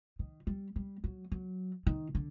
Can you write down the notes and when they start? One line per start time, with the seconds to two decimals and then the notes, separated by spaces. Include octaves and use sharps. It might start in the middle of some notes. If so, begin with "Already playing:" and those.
0.19 D#3
0.47 G3
0.76 G3
1.04 F#3
1.32 F#3
1.87 D#3
2.15 D3